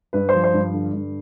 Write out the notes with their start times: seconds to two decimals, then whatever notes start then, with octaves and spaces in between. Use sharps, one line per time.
0.13 G2 B4
0.29 C5
0.34 F3
0.44 C5
0.54 G2
0.74 D3
0.93 G2